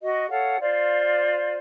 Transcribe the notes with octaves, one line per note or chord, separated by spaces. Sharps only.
F#4 D#5
A4 C#5 F5 F#5
F4 C5 D5 F5